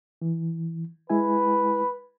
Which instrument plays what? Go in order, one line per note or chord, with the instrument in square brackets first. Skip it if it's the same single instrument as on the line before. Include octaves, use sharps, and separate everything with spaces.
[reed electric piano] E3
[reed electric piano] G#3 E4 G#5 [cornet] B4